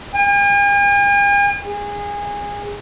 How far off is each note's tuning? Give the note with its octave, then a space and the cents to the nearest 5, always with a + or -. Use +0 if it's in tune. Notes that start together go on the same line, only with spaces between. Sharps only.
G#5 -45
G#4 -25